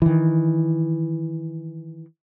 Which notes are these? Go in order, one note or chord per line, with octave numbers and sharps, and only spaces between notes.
D#3 E3